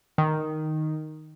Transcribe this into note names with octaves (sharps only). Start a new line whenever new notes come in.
D#3